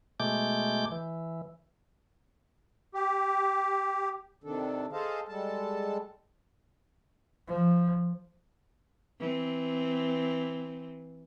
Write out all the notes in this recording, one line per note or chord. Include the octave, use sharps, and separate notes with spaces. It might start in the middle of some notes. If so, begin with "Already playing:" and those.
B2 G#3 A3 D6 G6
E3
G4
C3 D#3 D4 A4
G#4 A4 C5 D#5 F5 A5
G3 G#3 A4 A5
F3
E3 C4